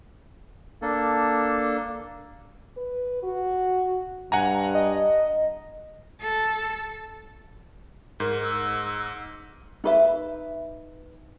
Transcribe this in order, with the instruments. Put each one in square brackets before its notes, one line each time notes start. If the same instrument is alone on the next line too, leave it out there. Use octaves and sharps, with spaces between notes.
[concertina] A#3 D4 A4
[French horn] B4
F#4
[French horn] G2 [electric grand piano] F#5 G#5 A#5
[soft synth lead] D#5
[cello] A4
[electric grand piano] G#2 [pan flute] A#4
[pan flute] E6
[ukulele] D#4 B4 E5